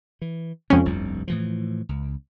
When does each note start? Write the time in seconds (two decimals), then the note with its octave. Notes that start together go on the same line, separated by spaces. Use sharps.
0.22 E3
0.70 F2 C3 G#3 C#4
0.85 F1 C2 G2
1.28 A2 E3 F3
1.89 C#2